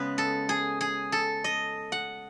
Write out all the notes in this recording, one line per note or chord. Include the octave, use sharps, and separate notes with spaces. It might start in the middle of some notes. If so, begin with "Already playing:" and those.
Already playing: C#3 G#3 B3 B4
A4
G#4
G#4
A4
D#5
F#5